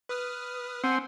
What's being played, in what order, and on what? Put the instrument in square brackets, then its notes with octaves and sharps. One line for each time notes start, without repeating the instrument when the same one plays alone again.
[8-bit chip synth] B4 D#6 F6
[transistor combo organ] C4 [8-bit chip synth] F#5 G#5